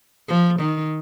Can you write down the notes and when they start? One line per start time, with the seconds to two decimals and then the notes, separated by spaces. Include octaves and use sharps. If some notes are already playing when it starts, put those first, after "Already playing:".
0.28 F3
0.60 D#3